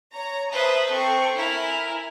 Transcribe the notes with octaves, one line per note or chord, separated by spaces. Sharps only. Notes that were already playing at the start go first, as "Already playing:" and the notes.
C#5 A#5
B4 C5 E5 A5 D#6
C4 A4 C#6
E4 A#4 G#5